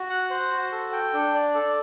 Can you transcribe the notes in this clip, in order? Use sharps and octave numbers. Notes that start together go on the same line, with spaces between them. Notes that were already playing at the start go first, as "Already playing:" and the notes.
Already playing: F#4
F#5
C5
F#4
A4
G5
D4
D5
A4